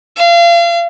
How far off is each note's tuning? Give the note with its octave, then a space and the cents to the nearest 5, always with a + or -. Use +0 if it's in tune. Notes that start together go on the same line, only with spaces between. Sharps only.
F5 -35